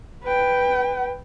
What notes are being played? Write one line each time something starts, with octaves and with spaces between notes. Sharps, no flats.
B4 G5